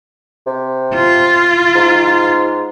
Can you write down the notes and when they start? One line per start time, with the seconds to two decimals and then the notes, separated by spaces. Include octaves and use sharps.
0.47 C3
0.94 F4
1.75 G#2